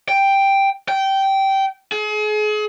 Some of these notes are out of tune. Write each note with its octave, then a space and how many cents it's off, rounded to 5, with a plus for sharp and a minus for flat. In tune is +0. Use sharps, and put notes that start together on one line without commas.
G5 +5
G5 -15
G#4 +35